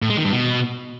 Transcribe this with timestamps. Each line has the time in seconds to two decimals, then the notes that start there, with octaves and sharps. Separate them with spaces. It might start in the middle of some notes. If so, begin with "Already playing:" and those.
0.02 A2
0.10 G#3
0.17 D#3
0.25 G2
0.32 B2